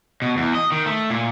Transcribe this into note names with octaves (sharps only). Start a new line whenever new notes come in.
B2
E2
D#5
D#3
A3
A#2